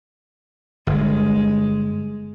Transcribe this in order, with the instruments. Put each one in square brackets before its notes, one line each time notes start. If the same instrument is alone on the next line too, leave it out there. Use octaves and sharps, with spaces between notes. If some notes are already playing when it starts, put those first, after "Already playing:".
[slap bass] G1 [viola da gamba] G#3